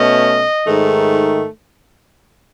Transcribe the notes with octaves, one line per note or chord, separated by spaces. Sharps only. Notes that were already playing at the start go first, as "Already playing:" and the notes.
Already playing: B2 A3 C#4 D#5
G#2 D#3 A3